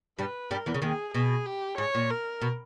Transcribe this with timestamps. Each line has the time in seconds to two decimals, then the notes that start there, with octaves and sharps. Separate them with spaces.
0.18 G2 G3 B4
0.50 G2 G3 A#4
0.66 E2 E3
0.74 C#3
0.82 D#2 D#3 G#4
1.14 B2 G#4
1.46 G4
1.77 G#2 C#5
1.95 A#2
2.10 A#4
2.41 B2